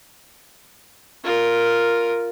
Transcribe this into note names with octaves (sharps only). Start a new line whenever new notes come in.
F4 A#4